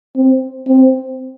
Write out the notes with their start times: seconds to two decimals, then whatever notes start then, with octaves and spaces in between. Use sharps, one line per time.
0.16 C4
0.68 C4